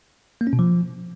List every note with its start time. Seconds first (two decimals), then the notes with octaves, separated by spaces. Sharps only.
0.41 A#3
0.47 C#4
0.53 B2
0.59 F3